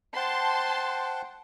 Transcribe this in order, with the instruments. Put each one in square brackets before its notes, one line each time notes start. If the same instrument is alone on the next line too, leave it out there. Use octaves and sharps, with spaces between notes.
[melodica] C5 F#5 G5 [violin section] A5 C6